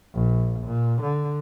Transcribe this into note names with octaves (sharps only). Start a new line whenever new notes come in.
A#1
A#2
D3